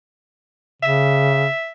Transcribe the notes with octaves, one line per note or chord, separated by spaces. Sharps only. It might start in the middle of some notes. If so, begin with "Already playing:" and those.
C#3 E5